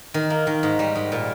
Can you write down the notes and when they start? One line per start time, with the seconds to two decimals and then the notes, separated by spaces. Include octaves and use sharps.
0.14 D#3
0.30 A#3
0.47 D#3
0.63 G#2
0.79 G3
0.95 G#2
1.12 A#2